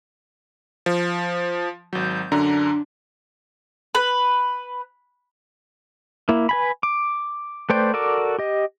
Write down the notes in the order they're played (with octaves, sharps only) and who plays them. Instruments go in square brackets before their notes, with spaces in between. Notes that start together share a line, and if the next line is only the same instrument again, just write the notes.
[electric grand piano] F3
[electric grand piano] G#1 F#3 [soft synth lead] G6
[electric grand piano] F#2 D3 A#5 [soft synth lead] D4
[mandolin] B4
[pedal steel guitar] A#3 E4
B4 G#5 B5
D6
A3 B4 C5 D5 G5
F#4 A4 A#4 D5 D6
G4 D#5